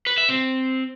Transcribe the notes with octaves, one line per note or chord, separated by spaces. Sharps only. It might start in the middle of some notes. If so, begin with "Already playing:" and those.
B4
E5
C4